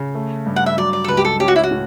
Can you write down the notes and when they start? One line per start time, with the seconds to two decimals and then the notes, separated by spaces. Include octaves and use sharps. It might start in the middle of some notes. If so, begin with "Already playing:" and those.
Already playing: C#3
0.15 A3
0.46 G2
0.56 F#5
0.66 E5
0.77 F#3 D5
0.93 D5
1.04 A4
1.08 C#2 B4
1.17 G4
1.25 A4
1.40 C#4 G4
1.48 F#4
1.56 E4
1.63 F#4
1.71 A2